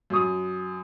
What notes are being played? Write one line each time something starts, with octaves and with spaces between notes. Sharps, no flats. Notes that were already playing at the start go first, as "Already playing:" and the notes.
F#2 D#6